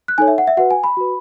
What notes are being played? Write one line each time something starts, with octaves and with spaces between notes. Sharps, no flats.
F#6
D#4 A4 C#5 G#5
E5
F#5
E5
F#4 B4 F#5
G#5
B5
F#4 B4